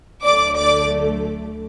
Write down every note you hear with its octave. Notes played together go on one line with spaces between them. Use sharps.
D2 D3 F#3 A3 D5 D6
D5 D6